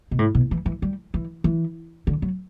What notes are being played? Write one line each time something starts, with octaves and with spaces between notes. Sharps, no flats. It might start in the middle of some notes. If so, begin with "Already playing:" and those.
B2
A2
B2
E3
E3
G3
E3
E3
D3
F#3